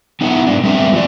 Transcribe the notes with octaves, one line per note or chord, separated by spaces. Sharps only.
B3 D#4 E4 F5 F#5
G#2 D4
G3 A3 B3 C4 E5
A2 F3 C4 D5